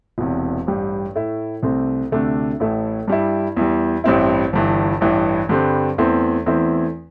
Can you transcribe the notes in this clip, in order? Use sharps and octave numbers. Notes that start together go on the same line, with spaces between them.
E1 E2 C3
A1 G2 G3
A2 A3 E4
C2 C3 A3 C4
D2 C3 A3 D4
A1 A2 A3 E4
G2 G3 E4
E2 E3 G3
A1 G2 G3 C4 E4
G1 G2 E3
A1 G2 E3
G2 D3 G3 C4
E2 E3 A3 C4
E2 E3 A3 C4 E4